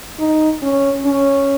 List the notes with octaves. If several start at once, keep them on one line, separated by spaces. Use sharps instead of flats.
D#4
C#4
C#4